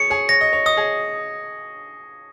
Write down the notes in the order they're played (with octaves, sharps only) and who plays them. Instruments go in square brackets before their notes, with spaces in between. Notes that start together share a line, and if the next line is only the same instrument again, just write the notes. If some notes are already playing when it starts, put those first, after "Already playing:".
Already playing: [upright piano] G#4 C#5 [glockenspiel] C#7
[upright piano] G#4 C#5
[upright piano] C#5 [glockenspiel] A#6
[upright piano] D#5
C#5
[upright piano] D#5 [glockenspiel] D#6
[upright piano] G#4 C#5